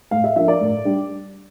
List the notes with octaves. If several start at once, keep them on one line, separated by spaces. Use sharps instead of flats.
A2 F5
E5
F3 A#3 D4 E5
D5
A2
G3 D4